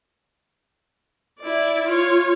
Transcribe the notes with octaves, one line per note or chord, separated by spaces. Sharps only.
E4 D5
F4 C#5